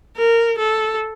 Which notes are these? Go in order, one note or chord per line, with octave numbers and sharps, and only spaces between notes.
A#4
A4